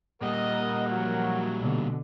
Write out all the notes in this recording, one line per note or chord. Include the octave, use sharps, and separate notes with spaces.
A#2 G3 A#4 D#5 F#5
F3 F#3
B2 D3